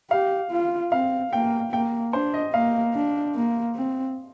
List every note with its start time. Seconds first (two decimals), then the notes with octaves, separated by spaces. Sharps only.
0.11 G4 F5
0.51 F4
0.92 C4 F5
1.32 A#3 G5
1.72 A#3 G5
2.13 D4 C5
2.34 D#5
2.53 A#3 F5
2.94 D4
3.35 A#3
3.75 C4